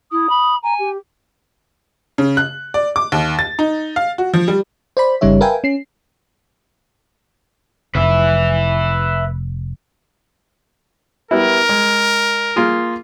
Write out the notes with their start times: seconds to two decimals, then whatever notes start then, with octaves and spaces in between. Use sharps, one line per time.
0.11 E4 D#6
0.29 B5
0.63 G#5 A#5
0.79 G4
2.18 C#3
2.37 F#6
2.74 D5
2.96 D6
3.12 D#2
3.39 A6
3.59 D#4
3.96 F5
4.18 F#4
4.34 F3
4.48 G3
4.97 C5 D5 B5
5.21 G1 C#3 G3 D#4 C#5 E5
5.41 A#4 B4 E5 F5 G5 G#5
5.64 C#4 C7
7.95 F1 B4 E5
11.31 G3 B3 E4 A#4
11.69 G#3
12.56 A#3 F4 G#4